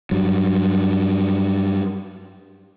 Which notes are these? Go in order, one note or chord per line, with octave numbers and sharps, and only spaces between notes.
G2 F#3